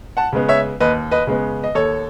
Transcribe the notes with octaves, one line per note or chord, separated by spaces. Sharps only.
F#5 A5
C#3 G#3 B3
C#5 E5
D#2 B4 D#5
B4 D#5
C#3 G#3 B3
D#5
D#2 A4 C#5